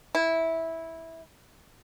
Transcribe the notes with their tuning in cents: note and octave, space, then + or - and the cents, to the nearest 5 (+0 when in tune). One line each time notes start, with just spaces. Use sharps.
E4 -10